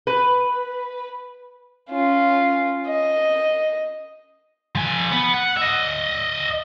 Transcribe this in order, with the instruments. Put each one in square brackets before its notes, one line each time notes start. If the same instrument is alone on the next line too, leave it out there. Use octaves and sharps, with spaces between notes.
[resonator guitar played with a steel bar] B4
[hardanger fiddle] C#4 F4
D#5
[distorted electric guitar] F3 G#5
B3
F#5
D#5 E5